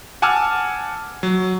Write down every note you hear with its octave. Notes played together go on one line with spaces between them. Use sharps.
F#5 G#5 A5 D6 E6 F6
F#3